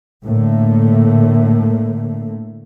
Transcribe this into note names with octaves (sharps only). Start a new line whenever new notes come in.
A2 D3 A3 A#3